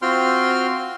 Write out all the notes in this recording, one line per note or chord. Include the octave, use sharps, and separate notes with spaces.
C4 F4 F#4 G5 C6 F6